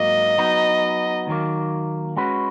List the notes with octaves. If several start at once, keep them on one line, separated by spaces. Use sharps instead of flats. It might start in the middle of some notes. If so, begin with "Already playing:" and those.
Already playing: G#2 F#3 A#3 D#5
F#3 B3 D#4
D#2 D#3 F#3 A#3
G#3 C#4 F#4 B4